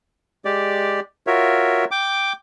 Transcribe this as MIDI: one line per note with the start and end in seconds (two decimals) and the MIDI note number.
0.45 1.00 56
0.45 1.00 67
0.45 1.00 74
1.27 1.85 65
1.27 1.85 66
1.27 1.85 70
1.27 1.85 73
1.27 1.85 76
1.91 2.33 79
1.91 2.33 86